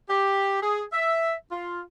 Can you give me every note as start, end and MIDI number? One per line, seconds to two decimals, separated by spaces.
0.10 0.59 67
0.62 0.83 68
0.93 1.34 76
1.51 1.81 65